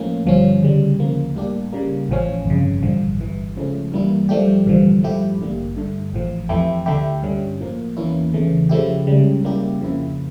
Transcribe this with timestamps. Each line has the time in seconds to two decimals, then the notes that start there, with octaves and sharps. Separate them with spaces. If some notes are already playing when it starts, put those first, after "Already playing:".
Already playing: A2 F3 A#3 C#4
0.25 G1 G2 F3 C#4
0.62 D2 C#3 G3
0.98 D2 C#3 F3 A#3
1.36 A2 G3 A#3 D4 G4
1.72 C#3 G3 A#3
2.09 A1 A2 F3 C#4
2.45 G1 F2 C#3
2.82 A1 G2 D3 F3
3.19 G1 G2 E3
3.56 C#2 C#3 F3 A3 C#4
3.92 G2 E3 G3 A#3 E4
4.29 G2 F3 A3 D4 G4
4.66 A1 G2 D3 F3
5.02 G2 F3 A3 E4 G4
5.39 A1 G2 D3 G3 A#3
5.77 G2 D3 A3
6.13 A1 A2 F3
6.49 F2 E3 A3 E4 G4
6.86 D2 D3 A3 E4 G4
7.22 G2 D3 G3 C#4
7.60 A2 F3 A#3
7.97 E2 E3 A#3 C#4 E4
8.33 E2 C#3 E3 A3
8.69 C#3 F3 A3 E4 G4
9.07 C#2 C#3 G3
9.43 C#3 G3 A#3 E4 G4
9.80 F2 C#3 F3 A#3 E4